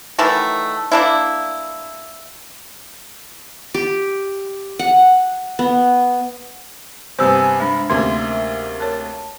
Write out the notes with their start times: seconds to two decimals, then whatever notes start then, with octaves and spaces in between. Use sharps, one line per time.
0.19 D#3 E3 F#3 A3
0.92 A#3 D4 E4
3.74 G4
4.79 F#5
5.59 B3
7.19 G2 C3 B3 C5 G#5 E6
7.60 G#3 D4 B5
7.90 D2 C3 A#3 C#4 C5 E5 C6
8.80 A#4 C#5 A5